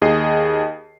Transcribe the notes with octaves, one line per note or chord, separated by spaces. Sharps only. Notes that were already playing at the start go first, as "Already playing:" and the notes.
D#2 G#4 D#5 C7